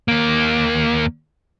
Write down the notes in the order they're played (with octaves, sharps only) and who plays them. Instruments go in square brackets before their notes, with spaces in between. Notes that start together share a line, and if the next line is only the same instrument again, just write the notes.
[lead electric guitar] D#2 A#3